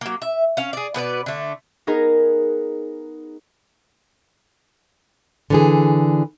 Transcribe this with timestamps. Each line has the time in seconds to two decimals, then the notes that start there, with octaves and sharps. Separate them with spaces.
0.01 F#3 A#3
0.22 E5
0.57 C#4 F5
0.73 G#4 D5
0.94 B2 B3 B4 D5
1.26 D3 A3
1.87 B3 D#4 G#4 A#4
5.50 D3 E3 G#4